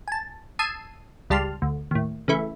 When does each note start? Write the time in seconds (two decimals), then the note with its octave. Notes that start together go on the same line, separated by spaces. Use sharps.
0.08 G#5 A5
0.59 A5 D#6 E6 G#6 C7 D#7
1.30 C#2 G3 G4 A5 C6 F6
1.62 D2
1.91 D#2 A2
2.28 C#3 E3 A3 E4